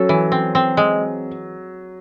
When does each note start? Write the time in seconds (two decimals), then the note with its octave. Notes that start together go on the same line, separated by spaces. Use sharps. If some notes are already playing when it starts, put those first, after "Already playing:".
Already playing: F#3 C#4 A4
0.09 E3
0.32 C4
0.55 C4
0.77 G#3